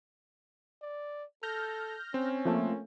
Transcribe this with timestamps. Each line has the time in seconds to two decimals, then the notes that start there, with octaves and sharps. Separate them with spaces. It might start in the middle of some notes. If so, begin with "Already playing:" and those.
0.82 D5
1.43 A4 F6 G6 A#6
2.14 C4 C#4
2.45 F3 A3 A#3